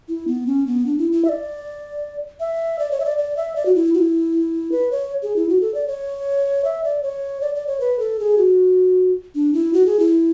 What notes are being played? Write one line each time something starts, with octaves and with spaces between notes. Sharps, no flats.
E4
B3
C#4
B3
D4
E4
E4
E5
D5
E5
D5
C#5
E5
D5
D5
E5
D5
F#4
E4
F#4
E4
B4
C#5
G#4
E4
F#4
A4
D5
C#5
E5
D5
C#5
D5
D5
C#5
B4
A4
G#4
F#4
D4
E4
F#4
G#4
E4